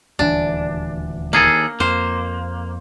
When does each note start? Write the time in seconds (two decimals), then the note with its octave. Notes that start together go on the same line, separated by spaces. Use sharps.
0.19 D#1 D2 E3 D4
1.33 D#2 A#3 G#4 A4
1.80 F2 A#3 C5